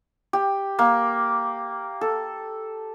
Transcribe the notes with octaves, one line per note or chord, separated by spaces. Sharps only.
G4
A#3
A4